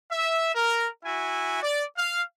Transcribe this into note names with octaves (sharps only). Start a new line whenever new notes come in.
E5
A#4
E4 F#4 E5 G#5
D5
F5